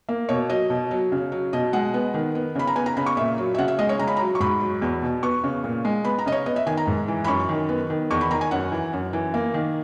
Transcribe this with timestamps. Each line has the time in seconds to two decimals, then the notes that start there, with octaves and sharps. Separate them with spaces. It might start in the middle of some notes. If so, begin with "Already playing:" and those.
0.09 A#3
0.29 B2 C#5
0.50 F#3 D#5
0.70 B2
0.91 F#3
1.12 C#3
1.32 F#3
1.53 B2 D#5
1.73 G#3 F#5
1.94 B3
2.14 D#3
2.35 B3
2.55 C#3 B5
2.67 A#5
2.76 B3 G#5
2.86 A#5
2.97 C#3 B5
3.06 C#6
3.16 A#2 E5
3.38 F#3
3.54 E5
3.58 C#3 F#5
3.68 E5
3.79 G#3 D#5
3.89 C#5
3.99 C#3 A#5
4.08 B5
4.17 A#5
4.19 F#3
4.35 C#6
4.40 G#2 B5
4.61 F#3
4.82 E2
5.02 B2
5.23 B3 C#6
5.44 C#3
5.64 A#2
5.85 G#3
6.05 B3 B5
6.19 A#5
6.26 C#3 D#5
6.32 C#5
6.46 B3 D#5
6.56 E5
6.66 D#3 G#5
6.77 A#5
6.87 G#2
7.08 E3
7.24 B5
7.28 F#2 C#6
7.49 D#3
7.69 B3
7.90 D#3
8.10 E2 C#6
8.21 B5
8.31 D#3 A#5
8.41 G#5
8.51 F#2 F#5
8.72 E3
8.93 F#2
9.13 E3
9.34 A#3
9.54 D#3